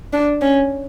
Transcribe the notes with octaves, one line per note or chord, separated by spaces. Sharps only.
D4
C#4